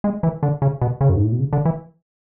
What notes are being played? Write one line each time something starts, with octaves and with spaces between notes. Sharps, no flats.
G#3
E3
D3
C#3
B2
C#3
F#2
G#2
A2
B2
C#3
D3
E3